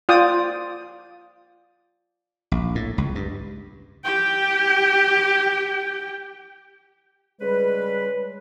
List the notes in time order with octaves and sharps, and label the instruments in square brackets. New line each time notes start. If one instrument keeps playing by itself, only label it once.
[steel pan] F4 D5 G5 D#6
[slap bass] A#1
A2
C#2
G2
[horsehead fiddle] G4 G5
[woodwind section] C#3 G3 G#3 B4